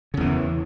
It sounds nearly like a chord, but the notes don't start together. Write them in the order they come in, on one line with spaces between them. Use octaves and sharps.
C#3 E2 E3